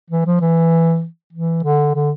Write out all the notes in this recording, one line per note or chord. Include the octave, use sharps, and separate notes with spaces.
E3
F3
E3
E3
D3
D3